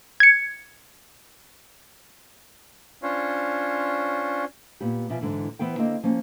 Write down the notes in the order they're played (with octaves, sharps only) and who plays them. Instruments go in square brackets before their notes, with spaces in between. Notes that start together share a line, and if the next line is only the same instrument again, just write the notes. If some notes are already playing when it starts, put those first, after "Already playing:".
[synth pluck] G#6 C#7
[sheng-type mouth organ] C#4 D4 F4 C5 C#5
[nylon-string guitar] A#2 B3 G4
B2 F3 D5 E5 G#5
G#2 D3 E3
E3 B3 C5 G5
D3 A#3 C4 D#5 G5
F3 A#3 C#4